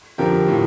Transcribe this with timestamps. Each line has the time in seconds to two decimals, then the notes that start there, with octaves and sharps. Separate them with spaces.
0.18 F2 D3 F3 G4 A#4
0.48 A2 F3